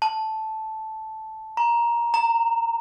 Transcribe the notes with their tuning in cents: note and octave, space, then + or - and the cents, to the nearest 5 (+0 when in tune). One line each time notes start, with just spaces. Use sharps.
A5 -5
A#5 +15
A#5 -20